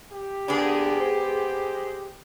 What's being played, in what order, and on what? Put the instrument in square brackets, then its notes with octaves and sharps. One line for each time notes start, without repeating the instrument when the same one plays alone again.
[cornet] G4
[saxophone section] D2 A#3 D4 [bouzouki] B3 G#4
[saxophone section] G#3 C5